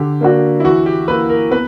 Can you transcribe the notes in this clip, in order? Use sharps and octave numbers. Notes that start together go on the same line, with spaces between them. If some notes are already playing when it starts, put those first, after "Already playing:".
Already playing: D3 G4
A#3 D4 F#4
E4
E3 F#4
G4
A#3 E4 B4
A#4
B3 B4